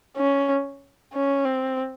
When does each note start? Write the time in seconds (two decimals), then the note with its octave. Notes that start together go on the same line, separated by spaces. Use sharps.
0.17 C#4
1.13 C#4
1.45 C4